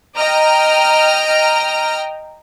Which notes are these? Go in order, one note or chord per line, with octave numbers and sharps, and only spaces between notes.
D#5 G5 A#5 F6